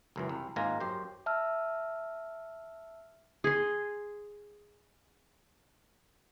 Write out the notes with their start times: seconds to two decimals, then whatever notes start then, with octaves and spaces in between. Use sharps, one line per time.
0.16 C#2 F#2 E3
0.29 C2
0.56 G#1 G#2 A#3 F4 G#5 A#5
0.80 F#2 G4 C5
1.26 E5 A5 E6 F6
3.44 G#4 C6